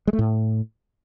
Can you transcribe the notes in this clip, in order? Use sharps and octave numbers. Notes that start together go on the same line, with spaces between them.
G#3
A3
A2